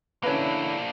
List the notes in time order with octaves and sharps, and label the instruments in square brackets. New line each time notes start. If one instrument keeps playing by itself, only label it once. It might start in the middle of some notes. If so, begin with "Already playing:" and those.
[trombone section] D3 E4 [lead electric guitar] A#3 D4 [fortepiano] C#4 B4